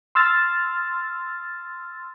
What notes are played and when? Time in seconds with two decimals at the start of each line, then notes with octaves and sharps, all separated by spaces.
0.15 C6 E6 F6 A6